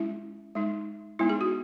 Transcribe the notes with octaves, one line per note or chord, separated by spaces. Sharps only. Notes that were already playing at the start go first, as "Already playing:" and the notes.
Already playing: G#3 C#4 E4
G#3 D#4
G#3 B3 D#4 E4
G#4
F#4